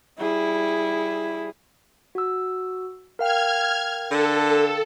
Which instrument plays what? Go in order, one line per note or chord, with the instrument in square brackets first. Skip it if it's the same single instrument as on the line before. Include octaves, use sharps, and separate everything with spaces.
[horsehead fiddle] G3 G#4 [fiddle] E4
[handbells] F#4 E6
[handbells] A#4 F5 G5 [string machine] F6 G#6
[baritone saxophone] D3 [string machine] A4